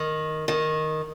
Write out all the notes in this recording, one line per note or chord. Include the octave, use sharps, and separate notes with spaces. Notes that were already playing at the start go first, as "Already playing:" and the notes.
Already playing: D#3
D#3